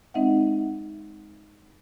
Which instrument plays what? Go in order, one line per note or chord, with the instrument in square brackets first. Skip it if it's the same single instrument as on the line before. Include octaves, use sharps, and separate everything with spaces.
[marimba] G#3 C4 D#4 D#5 E5 F#5